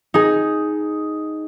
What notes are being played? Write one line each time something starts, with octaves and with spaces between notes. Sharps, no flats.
D#4 G#4